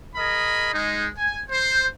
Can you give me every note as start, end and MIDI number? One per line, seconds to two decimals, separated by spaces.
0.16 0.71 68
0.16 0.71 70
0.16 0.71 75
0.16 0.71 83
0.73 1.07 56
0.73 1.07 63
1.17 1.41 80
1.49 1.87 72